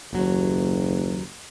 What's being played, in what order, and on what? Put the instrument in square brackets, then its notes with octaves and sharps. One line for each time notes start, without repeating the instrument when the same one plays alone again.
[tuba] F#1 [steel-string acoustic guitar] D#2 F#3